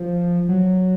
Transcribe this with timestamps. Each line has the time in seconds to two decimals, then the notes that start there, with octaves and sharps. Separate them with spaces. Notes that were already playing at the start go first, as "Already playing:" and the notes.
Already playing: F3
0.49 F#3